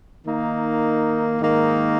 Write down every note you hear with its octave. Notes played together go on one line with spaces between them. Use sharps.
D#3 A#3 D#4
G#2 D#3 A#3 D#4